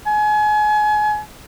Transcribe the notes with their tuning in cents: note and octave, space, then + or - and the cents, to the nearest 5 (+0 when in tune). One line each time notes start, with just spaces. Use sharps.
G#5 +30